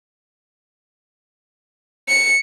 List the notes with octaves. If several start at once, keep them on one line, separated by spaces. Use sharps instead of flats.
C#7